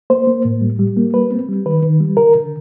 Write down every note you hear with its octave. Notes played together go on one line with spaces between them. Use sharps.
A#3 C5
A#3
A2
G3
G3
A#3
G3 B4
C4
G3
D#3 B4
D#3
G3
D3 A#4
D3